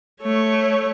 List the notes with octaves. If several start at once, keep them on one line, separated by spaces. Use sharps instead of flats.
A3 C#5